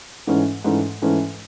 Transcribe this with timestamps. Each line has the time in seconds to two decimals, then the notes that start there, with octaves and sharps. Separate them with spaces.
0.27 G#2 E3 A3 C#4
0.64 G#2 E3 A3 C#4
1.02 G#2 E3 A3 C#4